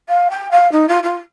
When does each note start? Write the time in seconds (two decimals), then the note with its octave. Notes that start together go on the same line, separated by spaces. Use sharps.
0.08 F5
0.30 G5
0.51 F5
0.72 D#4
0.88 F4
1.03 F4